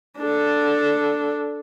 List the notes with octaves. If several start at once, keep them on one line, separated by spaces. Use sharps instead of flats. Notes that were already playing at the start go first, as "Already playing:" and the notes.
D4 A4